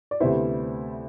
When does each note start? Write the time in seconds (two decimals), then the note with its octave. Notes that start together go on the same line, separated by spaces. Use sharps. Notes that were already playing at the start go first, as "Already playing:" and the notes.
0.11 D5
0.20 D2 C3 G3 B3 E4 C5 E5